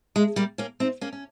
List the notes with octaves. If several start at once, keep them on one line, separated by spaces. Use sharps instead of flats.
G#3
G3 A#3
A#3 C#4
C4 D#4
A#3 C#4
C#4